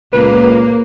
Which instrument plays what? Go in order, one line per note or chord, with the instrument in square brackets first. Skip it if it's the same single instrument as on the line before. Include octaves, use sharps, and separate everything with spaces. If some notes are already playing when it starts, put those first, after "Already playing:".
[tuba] C#2 [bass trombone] A#2 [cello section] A#3 [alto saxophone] B4